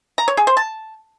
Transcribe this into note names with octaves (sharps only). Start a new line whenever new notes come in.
A#5
C#5
G#4
C5
A5